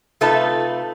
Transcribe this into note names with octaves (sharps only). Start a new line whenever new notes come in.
C3 A3 D#4 F4 B4 A5